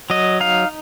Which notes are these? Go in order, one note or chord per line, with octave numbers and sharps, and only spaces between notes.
F#3 D#5
D#4 F5